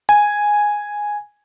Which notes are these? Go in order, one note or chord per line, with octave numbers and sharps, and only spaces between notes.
G#5